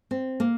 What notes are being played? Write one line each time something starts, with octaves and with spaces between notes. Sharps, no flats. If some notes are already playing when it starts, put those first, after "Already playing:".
C4
A#3